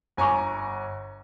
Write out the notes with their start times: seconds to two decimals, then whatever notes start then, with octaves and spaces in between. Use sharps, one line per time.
0.17 G1 G#5 A#5 C#6 D6